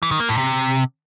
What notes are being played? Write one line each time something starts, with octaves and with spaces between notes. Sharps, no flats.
E3
D#3
A#3
A2
C3